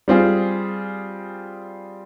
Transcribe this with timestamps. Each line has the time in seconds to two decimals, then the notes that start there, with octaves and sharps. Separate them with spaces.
0.08 G3 C4 F4 G#4